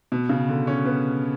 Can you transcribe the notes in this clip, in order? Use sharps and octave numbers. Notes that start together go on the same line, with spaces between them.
B2
C#3
D3
C#4
B3